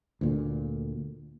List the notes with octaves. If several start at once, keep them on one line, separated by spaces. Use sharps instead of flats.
D2 A#2 D3